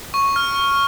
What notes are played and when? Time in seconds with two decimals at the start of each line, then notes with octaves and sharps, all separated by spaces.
0.14 C#6
0.36 F6